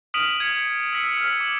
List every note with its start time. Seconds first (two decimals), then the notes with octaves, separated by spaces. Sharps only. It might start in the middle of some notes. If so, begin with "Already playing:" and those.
0.14 D#6 F6 B6 D7 D#7 F#7
0.40 G#6 C#7
0.93 E6 B6 C#7
1.17 F6
1.40 D6